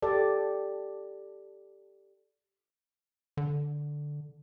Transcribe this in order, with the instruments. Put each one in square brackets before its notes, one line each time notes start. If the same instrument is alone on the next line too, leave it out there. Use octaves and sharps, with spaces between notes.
[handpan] G4 A4 D5
[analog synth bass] D3